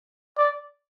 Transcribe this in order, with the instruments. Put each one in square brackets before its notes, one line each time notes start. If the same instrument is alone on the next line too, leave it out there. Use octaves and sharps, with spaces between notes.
[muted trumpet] D5